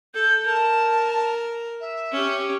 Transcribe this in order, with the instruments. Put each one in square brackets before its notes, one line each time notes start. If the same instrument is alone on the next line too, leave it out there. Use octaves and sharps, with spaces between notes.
[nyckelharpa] A4 [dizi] G6
[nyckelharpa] A#4 [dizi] A5
[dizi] E5
[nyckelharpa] C#4 G4